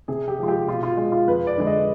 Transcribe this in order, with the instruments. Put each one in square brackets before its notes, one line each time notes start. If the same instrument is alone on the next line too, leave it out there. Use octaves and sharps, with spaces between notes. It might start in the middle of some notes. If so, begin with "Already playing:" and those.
[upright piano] C3 G#4
G4
F3 G#3 F4
G4
B2 F4
F4
G#3
F4
F2 B4
D5
D3 G#3
D#5